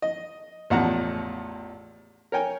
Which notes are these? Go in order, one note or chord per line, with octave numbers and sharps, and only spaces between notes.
D#5
A1 E2 F3 F#5 A5 A#5
A#4 C#5 G5 G#5